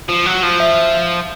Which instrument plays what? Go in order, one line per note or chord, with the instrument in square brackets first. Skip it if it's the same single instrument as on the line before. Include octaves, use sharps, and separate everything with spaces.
[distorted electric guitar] F3
F#3
F3
[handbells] E5